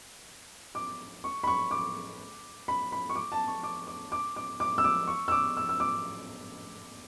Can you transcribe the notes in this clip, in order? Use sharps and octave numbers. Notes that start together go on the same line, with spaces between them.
D6
C#6
B5
C#6
D6
B5
B5
C#6
D6
A5
C#6
D6
D6
D6
D6
D6
E6
D6
C#6
E6
D6
E6
E6
D6